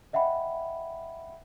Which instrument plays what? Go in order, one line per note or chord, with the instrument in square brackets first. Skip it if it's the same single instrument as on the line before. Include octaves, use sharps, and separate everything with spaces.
[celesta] D#5 E5 F#5 G5 B5